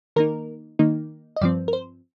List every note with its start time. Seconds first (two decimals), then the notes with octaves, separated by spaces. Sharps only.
0.16 D#3 A#3 D#4 A#4
0.79 D#3 A#3 D#4
1.36 D#5
1.41 G2 F3 C4 D5
1.68 A#4
1.73 C5